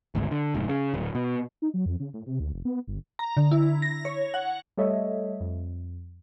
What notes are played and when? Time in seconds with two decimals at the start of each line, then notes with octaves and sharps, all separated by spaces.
0.15 G#1 D2 G#2
0.31 D3
0.54 F1 G#2
0.69 C#3
0.94 D1
1.15 B2
1.62 D#4
1.74 F#3
1.86 F2
2.00 C#3
2.14 A2
2.27 C3
2.40 D2
2.53 F1
2.65 B3
2.87 G1
3.19 A#5
3.37 D3
3.51 E4
3.82 A#6
4.05 C#5
4.34 F#5
4.77 G3 A3 A4 C#5 D#5 E5
5.40 F2